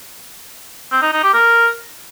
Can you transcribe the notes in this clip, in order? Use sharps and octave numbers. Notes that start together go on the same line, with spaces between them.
C4
D#4
D#4
G4
A#4